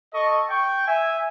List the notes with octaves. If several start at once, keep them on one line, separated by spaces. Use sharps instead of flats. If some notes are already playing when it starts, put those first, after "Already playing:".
A4 D#5 C#6
G5 C#6
E5 G#5